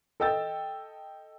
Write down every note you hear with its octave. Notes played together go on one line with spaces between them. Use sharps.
A4 D#5 G5 E6 A6